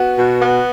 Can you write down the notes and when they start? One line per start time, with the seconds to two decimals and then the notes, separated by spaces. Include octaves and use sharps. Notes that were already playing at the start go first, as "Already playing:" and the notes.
Already playing: B3 F#4
0.17 B2
0.41 B3